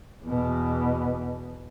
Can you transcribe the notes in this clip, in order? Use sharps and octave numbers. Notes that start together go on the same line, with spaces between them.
E2 B2